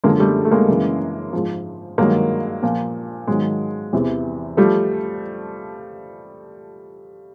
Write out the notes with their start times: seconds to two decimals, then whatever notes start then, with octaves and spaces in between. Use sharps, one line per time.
0.04 F#2 D3 F3 G#3 A#3
0.20 G3 A3
0.45 A3
0.51 G#3 A#3
0.68 F#2 C#3 E3
1.33 G#2 F3
1.98 G2 D#3 F#3 G#3 A#3
2.63 A#2 F3
3.27 G#2 D#3 F#3 G#3
3.93 E2 C3 E3
4.57 F3 G3 A3